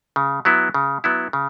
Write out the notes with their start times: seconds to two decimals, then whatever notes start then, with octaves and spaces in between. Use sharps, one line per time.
0.16 C#3
0.45 F#3 B3 E4
0.74 C#3
1.04 F#3 B3 E4
1.33 C#3